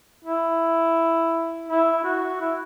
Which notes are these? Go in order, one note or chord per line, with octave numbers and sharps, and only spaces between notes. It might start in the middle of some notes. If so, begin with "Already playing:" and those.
E4
E4
F#4
E4